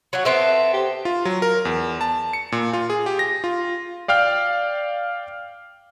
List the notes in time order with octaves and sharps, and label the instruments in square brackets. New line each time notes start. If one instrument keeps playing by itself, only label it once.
[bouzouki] F#3 F#4
[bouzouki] B3 C4 A4 [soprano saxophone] E5
[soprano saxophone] G4
[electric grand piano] F4
F#3
A#4
E2
A5
C#7
A#2
F4
G#4
G4
A#6
F4
D5 F5 G5 F6